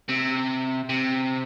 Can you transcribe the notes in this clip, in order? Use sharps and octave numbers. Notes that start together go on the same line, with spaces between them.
C3
C3